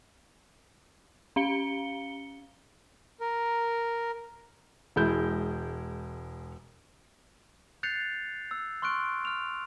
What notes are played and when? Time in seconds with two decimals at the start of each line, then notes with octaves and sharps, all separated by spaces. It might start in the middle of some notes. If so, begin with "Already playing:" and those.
1.36 C#4 F5 C#7 G7
3.20 A#4
4.96 E1 G#3 E4 G6
7.83 F#6 G6 A6 C7 C#7 F7
8.51 E6
8.82 C6 C#6 F6 F#6 D7
9.25 F6 F7